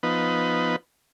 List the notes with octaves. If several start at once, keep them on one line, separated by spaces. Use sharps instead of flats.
F3 B3 D#4 B4